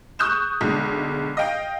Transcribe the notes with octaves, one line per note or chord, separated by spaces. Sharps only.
C#6 D#6 F#6 G6 E7
B1 D3 G#3
D#5 F5 G5